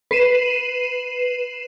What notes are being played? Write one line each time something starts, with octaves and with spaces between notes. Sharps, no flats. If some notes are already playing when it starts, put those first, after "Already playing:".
B4 C7 D#7 E7